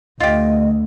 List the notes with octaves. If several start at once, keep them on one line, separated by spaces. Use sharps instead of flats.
D2 F4 G4 D#5